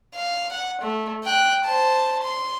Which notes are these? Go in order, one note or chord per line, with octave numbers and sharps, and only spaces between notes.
F5
F#5
A3
G5 F#6
C5 A5
C6